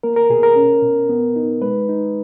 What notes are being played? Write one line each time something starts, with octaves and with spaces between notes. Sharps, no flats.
A#3 A#4
A#4
B2 G#4
A#4
C#4
B2
B3
D#4
G#3 B4
D#4